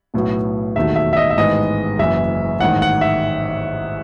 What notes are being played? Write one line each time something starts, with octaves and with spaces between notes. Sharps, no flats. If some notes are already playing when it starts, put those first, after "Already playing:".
B1 A2 F#3 B3
E1 D#2 D#3 F#3 A3 E5
E5
E5
D#5
E5
A1 G#2 D#3 G#3 B3 D#5
F#1 F#2 E3 E5
A1 G#2 D#3 F#5
F#5
E5